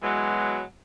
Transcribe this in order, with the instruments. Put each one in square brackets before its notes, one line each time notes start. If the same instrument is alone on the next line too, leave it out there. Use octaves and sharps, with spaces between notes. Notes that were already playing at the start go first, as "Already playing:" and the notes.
[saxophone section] B2 E3 F#3 [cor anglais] G#3